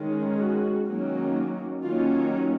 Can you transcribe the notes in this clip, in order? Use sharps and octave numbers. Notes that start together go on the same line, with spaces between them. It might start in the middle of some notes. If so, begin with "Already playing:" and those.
Already playing: D#3 G#3 C#4
F#4
D#3 F#3 A#3 C#4
D#3 F#3 A#3 C#4 F4